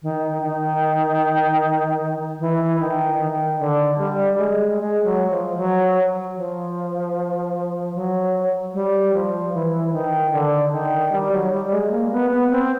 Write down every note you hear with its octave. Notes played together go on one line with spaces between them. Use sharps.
D#3
D#3
E3
D#3
D#3
D3
G3
G#3
G#3
F#3
F3
F#3
F3
F#3
G3
F3
E3
D#3
D3
D#3
G3
F#3
G3
G#3
A#3
B3
B3
C4